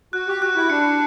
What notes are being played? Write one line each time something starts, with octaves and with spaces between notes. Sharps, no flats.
F#4 F#6
G4
F#4 F#6
E4
D4 C#7